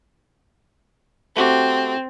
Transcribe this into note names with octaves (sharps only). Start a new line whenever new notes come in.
A3 C4 F#4 G4